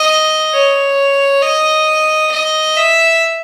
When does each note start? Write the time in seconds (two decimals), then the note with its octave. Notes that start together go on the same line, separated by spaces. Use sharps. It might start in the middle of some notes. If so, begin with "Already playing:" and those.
Already playing: D#5
0.54 C#5
1.43 D#5
2.32 D#5
2.77 E5